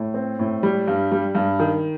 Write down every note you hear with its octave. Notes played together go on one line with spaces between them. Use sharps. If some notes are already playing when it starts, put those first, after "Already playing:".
Already playing: A2
C4
A2
G3
G2
G3
G2
D#3